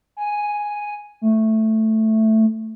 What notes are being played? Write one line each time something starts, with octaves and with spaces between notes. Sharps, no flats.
G#5
A3